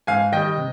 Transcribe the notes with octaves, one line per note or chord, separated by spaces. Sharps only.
G#2 F5 G#5
D#3 G3 D#5 G5
C3